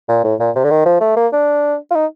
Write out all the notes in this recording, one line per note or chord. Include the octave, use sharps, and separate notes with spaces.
A#2
A2
A#2
C3
D3
D#3
F3
A3
A#3
D4
F4
D#4